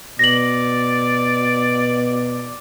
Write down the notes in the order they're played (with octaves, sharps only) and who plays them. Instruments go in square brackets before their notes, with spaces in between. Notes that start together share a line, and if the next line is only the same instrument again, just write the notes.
[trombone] B2 [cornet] D5 [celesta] A#6 F#7